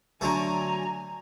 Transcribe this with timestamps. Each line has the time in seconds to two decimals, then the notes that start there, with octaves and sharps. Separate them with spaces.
0.21 D3 F#3 A3 G#5 A#5